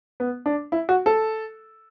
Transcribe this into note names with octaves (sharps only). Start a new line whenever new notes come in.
B3
D4
E4
F#4
A4